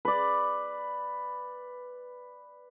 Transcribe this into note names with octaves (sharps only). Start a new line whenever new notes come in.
B4 D5